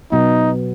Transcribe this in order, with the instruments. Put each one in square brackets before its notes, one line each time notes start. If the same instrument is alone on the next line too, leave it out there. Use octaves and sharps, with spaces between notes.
[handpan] B2 F#3 B3 [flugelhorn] D#4